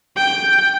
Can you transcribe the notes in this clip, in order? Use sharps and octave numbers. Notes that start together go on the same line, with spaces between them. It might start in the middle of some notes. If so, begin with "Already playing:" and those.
G5